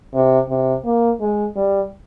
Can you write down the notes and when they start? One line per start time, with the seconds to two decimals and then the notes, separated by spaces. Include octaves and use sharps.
0.14 C3
0.49 C3
0.85 A#3
1.21 G#3
1.56 G3